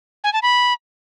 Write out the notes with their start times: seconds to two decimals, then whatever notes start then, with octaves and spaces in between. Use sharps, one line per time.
0.24 G#5
0.33 A5
0.42 B5